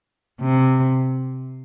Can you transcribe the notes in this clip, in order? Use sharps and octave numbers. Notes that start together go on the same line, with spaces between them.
C3